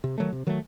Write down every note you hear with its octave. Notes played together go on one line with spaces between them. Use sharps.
C3
D#3 F#3 A3
C3
D#3 F#3 A3